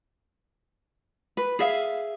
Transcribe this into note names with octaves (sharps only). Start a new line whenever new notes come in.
B4
G#4 E5 F5